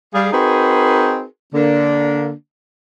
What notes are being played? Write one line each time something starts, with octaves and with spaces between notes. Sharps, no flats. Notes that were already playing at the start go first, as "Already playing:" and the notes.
G3 G#4 F5
C4 D#4 F#4 G#4 A#4 B4
D3 A#3 D4